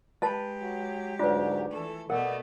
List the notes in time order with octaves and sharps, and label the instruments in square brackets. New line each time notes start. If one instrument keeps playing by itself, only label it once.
[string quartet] G#3 G4 [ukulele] B4 [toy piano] D#5 A5
[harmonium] F#3
[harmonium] D2 G#2 F#3 [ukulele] D4 [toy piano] F4 B4
[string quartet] E3 A4 [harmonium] A3
[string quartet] B2 A3 [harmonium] B3 D5 D#5 [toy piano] A#4 [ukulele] F#5